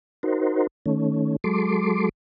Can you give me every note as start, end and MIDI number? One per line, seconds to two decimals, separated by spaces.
0.23 0.67 63
0.23 0.67 66
0.23 0.67 70
0.23 0.67 72
0.86 1.36 51
0.86 1.36 57
0.86 1.36 61
1.44 2.09 54
1.44 2.09 56
1.44 2.09 69
1.44 2.09 84
1.44 2.09 86